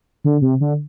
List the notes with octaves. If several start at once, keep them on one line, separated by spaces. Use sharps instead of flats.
D3
C3
D3